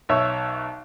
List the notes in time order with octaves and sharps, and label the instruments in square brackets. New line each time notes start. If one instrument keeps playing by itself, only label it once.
[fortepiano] B1 C#5 E5